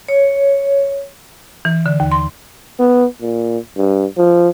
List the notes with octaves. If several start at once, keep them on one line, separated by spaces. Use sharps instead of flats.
C#5
E3
D3
D#2
C6
B3
A#2
G2
F3